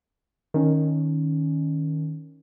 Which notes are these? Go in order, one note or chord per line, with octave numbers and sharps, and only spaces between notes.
D#3 C#4